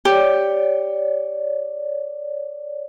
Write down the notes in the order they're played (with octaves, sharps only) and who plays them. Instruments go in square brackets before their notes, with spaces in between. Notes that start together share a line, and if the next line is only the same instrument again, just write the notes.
[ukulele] G4 [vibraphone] C#5 D5